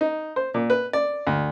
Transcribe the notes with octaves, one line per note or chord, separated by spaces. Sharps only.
D#4
C5
A#2
B4
D5
D2